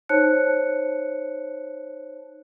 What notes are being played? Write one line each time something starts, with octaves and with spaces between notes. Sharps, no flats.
D#4 C5 C#5 A5 F#6 C#7